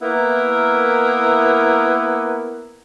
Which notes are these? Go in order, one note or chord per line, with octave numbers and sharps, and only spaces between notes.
A#3 B3 E4 A#4